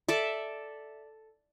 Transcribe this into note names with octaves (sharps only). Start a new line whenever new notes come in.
A4 D5 E5